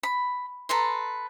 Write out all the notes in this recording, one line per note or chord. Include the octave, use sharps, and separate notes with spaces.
B5
A4 B4 A#5 C6